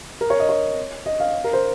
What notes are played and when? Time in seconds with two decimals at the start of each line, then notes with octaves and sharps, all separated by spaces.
0.21 A#4
0.30 C#5
0.40 D#5
0.49 C#5
1.06 D#5
1.20 F5
1.44 A#4
1.53 C5